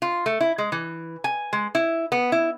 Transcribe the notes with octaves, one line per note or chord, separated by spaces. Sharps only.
F4
A3
E4
G#3
E3
G#5
G#3
E4
B3
E4